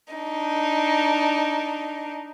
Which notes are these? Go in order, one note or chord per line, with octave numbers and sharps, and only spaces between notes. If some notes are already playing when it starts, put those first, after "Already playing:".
D4 D#4